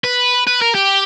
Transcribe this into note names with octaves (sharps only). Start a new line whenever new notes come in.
B4
B4
A#4
G4